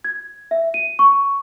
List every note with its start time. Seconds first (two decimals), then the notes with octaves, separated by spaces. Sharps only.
0.05 G#6
0.51 E5
0.74 D#7
0.99 C#6